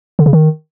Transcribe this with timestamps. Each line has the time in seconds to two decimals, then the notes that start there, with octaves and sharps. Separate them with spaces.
0.19 D3
0.26 C#3
0.33 D#3